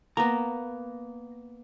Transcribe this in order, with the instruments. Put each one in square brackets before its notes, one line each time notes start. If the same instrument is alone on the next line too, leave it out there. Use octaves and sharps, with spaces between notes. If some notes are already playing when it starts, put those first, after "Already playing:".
[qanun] A#3 B3 [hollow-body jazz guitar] A#5